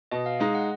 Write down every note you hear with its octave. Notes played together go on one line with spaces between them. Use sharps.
B2 D#5
F5
G#3 D#4 D#5
F#5